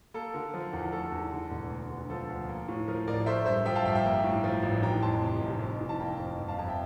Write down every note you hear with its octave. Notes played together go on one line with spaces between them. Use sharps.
A#3 A4
D3 A#4
F3
E2
A3 A4
E2
D3
E1
D2
D3
F3 A4
D2
A#3
A2
F3 A#4
A1 A#4 D5
A3 C5 E5
G2 C5 E5
F3 E5 G5
F5 A5
G1 E5 G5
E5 G5
A#3
A2
F3
A1
E3 G5 A#5
F2 A5 C6
C3
F1
F2
E3
A5
A#3 G5 A#5
F2
G1
F5 A5
F2 F5 A5
E5 G5